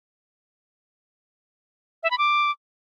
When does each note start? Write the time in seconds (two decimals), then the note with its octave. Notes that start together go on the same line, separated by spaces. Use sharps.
2.03 E5
2.11 B5
2.18 D6